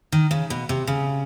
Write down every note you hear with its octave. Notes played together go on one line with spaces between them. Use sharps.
D#3
C#3
B2
C3
C#3